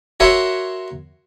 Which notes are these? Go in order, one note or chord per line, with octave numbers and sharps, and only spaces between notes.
F#4 A#4 C#5 E5 F#5 C6